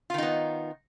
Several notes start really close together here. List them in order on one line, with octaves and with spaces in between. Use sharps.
F4 D#3 D#4 B3